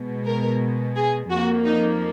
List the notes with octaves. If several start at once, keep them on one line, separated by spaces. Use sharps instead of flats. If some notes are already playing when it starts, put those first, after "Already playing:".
Already playing: B2 G#3
A#4
G#4
F2 F3 A#3 F#4
D#4